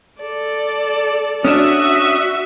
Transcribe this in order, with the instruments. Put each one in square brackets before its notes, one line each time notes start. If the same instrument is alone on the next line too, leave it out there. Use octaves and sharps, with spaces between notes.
[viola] A4 D5
[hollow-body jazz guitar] C#4 D4 [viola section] F#4 E5 [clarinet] D#6